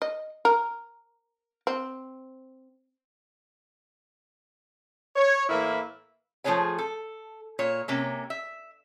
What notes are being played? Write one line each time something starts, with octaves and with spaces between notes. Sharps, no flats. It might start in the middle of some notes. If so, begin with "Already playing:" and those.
D#5
A#4
C4
C#5
A2 E3 A#3 E4 B4 E5
F3 A3 D#4 G#4 C#5 G#5
A4
A#2 C#5
C3 A#3 C#4
E5